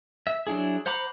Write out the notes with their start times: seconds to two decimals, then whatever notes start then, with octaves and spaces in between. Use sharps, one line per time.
0.27 E5
0.47 F#3 D4 E4 G#4
0.86 C5 F#5 A#5 B5 D6